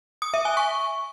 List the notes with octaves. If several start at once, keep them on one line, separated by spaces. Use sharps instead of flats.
D#6
E5
G#5
C#6